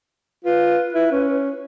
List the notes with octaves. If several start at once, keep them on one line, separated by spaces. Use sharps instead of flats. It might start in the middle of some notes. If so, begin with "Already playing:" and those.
F4 B4
E4
C#4